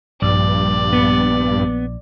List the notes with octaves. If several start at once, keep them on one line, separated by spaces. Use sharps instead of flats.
A#1 G2 D5
B3